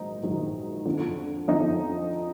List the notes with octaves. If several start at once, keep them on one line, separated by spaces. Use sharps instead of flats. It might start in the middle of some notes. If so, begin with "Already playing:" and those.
Already playing: A#1 G#2 D#3 F#3 D#4
A#1 G#2 D#3 F#3
F2 D3 F3
F2 D3 F3 D#4